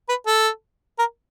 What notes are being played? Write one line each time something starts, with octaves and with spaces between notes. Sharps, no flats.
B4
A4
A#4